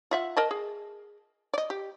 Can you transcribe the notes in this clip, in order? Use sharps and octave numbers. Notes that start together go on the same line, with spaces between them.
F4 E5 F#5
A#4 D#5 A5
G#4
D5 D#5
G4